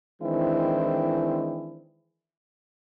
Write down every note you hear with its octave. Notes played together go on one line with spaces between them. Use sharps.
D#3 E3 G#3 C4 D4 E4